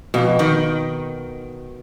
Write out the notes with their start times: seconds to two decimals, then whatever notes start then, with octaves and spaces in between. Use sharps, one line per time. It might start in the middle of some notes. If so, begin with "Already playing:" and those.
0.14 F2 B2
0.39 D#3